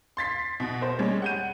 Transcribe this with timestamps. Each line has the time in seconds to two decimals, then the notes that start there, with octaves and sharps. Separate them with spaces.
0.17 C6 A6 B6 C7
0.60 B2
0.81 A#4 C5
0.99 G3 G#3 C#4 C#5
1.22 F#5 G6 D#7